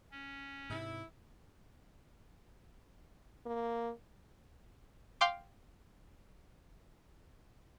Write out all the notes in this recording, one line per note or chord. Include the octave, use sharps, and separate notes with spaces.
C#4
G#2 C3 E4
A#3
F5 G5 C6 D6